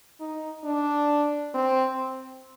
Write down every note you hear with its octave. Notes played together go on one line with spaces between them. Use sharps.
D#4
D4
C4